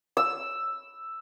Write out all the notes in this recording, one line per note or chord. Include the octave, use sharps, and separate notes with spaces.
E6